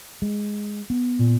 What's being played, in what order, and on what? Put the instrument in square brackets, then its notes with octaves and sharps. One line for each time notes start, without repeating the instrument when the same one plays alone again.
[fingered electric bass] G#3
B3
[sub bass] A#2